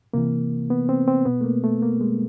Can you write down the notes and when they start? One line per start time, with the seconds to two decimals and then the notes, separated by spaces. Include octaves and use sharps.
0.14 C3 E3 A#3
0.70 B3
0.89 C4
1.08 C4
1.25 B2 B3
1.41 A3
1.44 A#3
1.64 A3
1.82 A#3
2.01 G#3